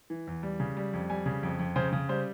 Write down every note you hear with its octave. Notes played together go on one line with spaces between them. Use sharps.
E3
E2
G3
C#3
G3
F2
G3 G#5
C#3
F2
F2
C#3 C5
C#3
G3 C5